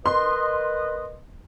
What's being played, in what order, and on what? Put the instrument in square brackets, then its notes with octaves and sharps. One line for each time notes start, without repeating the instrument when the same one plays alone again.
[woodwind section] A#4 B4 D#5 [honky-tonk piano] C6